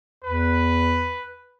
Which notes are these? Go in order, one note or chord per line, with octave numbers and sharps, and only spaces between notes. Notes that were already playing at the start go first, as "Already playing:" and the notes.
E2 B4